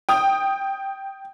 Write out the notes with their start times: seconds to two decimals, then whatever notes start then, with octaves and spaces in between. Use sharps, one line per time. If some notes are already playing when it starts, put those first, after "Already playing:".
0.09 G5 D#6